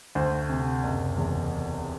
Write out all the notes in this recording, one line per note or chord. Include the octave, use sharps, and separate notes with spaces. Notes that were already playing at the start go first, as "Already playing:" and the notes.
D2 C5
C3
F#1
E2